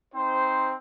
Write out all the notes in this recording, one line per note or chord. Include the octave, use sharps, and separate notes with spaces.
C4 D#4 C5